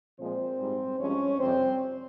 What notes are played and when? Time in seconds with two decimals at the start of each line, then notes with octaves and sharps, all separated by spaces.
0.19 A#2 F3 G#3 C4 C5
0.59 G#2 G3
0.99 G2 F3 G#3 C#4 C#5
1.39 F2 C3 G3 C4 C5